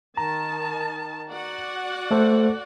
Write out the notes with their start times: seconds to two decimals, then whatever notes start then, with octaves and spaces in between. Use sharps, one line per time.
0.17 D#3 A5 A#5
1.28 F#4 D5 F#5
2.11 A3 A4 C5